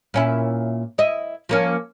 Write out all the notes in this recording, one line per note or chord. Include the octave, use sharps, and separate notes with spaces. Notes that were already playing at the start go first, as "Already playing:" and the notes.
A#2 C#4 E4
E4 D#5
F3 A#3 C#4